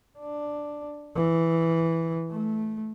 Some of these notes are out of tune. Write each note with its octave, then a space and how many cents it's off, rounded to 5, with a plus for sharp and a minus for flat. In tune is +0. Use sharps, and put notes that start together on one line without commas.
D4 +5
E3 +0
A3 -15